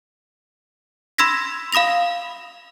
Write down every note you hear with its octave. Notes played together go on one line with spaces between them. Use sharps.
B5 C6 E6 G#6 A#6 B6
F5 B5 D#6 A#6 F7